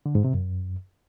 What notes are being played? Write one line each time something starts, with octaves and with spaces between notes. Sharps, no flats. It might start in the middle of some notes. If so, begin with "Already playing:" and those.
D3
G#2
C3
F#2